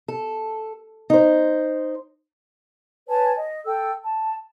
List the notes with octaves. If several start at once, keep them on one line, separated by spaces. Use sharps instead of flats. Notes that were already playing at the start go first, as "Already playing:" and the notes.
A4
D#4 C5
B4 C#5 G#5 A5
D#5
A4 G5 E6
A5